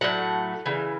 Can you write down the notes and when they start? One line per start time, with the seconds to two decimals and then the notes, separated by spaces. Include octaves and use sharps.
0.01 A2 F#3 A3 F#5
0.66 C#3 E3